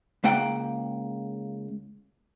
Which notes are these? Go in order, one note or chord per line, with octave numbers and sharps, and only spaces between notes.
C#2 A#3 F#5 G5